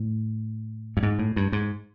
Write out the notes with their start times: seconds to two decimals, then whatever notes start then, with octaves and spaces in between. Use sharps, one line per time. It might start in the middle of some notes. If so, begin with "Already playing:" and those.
Already playing: A2
0.97 G2
1.03 G#2
1.19 A2
1.36 G2
1.52 G#2